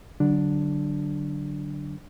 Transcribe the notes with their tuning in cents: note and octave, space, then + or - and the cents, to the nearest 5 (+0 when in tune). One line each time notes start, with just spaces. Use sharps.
D3 +0 F#3 +35 D4 +0